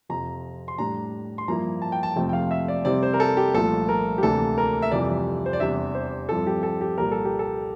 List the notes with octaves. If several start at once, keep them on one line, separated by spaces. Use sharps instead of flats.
F2 C3 F3 A#5
C6
A2 G3 D4 A#5
C6
G2 F3 A#3 E4 A#5
A5
G5
A5
F2 C3 F3 A3 C4 G5
G5
F5
E5
D5
C3 G3 C4 E4 D5
C5
A#4
A4
G4
C2 A#2 F3 A3 A4
A#4
G4
D2 C3 E3 A#3 D4 A4
A#4
E5
F2 C3 E3 G3 D5
C5
D5
E2 C3 G3 D4 E5
C5
G2 F3 C4 E4 A4
G4
A4
G4
C2 A#2 G3 A#4
A4
G4
A4